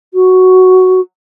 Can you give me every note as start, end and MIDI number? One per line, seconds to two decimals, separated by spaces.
0.14 1.00 66